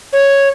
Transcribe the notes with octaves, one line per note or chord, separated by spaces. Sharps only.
C#5